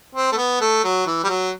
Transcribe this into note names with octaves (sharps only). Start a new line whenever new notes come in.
C4
A3
B3
A3
F#3
E3
G3
F#3